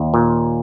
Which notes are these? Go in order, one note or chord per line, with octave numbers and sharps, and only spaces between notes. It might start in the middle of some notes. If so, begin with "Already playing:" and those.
Already playing: D#2
A#2